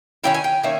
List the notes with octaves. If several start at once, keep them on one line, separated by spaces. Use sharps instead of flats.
D#3 A#3 C#4 E4 G5
G#5
G5
D#3 A#3 C#4 E5